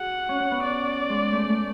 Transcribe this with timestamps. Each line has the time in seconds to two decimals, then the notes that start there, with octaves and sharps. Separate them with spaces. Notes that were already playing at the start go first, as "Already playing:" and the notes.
Already playing: F#4 G#4 F#5
0.29 C#4
0.40 C#4
0.51 B3
0.63 D5
1.09 G#3
1.32 A3
1.49 A3